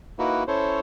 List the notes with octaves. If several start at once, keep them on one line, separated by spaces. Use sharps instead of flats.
A#3 D#4 E4 F#4 B4
C#4 E4 A4 C5 C#5